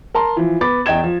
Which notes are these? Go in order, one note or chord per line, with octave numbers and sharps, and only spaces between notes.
A#4 A5 A#5 C6
E3 F3
B3 B5 D6 A6
E2 D#5 G5 G#6 E7
F3